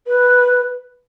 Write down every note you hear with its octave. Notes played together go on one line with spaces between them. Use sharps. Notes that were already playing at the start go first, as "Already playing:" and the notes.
B4